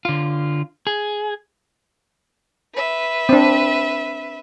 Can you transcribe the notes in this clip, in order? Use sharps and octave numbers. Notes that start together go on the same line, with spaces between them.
D3 F4
G#4
B4 E5
C4 D4